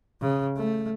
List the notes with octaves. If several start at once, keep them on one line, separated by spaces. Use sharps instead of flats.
C#3
A3